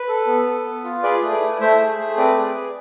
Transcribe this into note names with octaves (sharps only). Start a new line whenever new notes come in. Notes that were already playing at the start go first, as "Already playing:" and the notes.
Already playing: B4
A4
B3
A4
B3
F4
G#4 B4 D5
A3
B4 D5
E4
A3 C5 E5
G#4
A3
C4 B4 D5
G#4
G#4